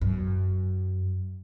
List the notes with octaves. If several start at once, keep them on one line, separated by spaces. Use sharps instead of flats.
F#2